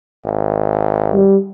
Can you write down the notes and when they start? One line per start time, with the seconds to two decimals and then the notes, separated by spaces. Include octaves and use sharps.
0.25 G#1
1.13 G3